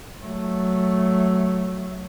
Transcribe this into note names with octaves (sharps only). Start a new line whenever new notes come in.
F#3 A3